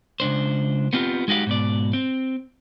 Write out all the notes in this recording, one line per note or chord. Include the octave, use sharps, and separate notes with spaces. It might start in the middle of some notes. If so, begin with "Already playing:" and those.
C#2 G#2 D4 C5
B3 C4 F4 G4
G#3 D#4 F#4 G4 F5
G#2 B2 D5
C4